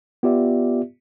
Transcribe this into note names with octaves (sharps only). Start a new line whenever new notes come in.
B3 F4 G4 D5 E5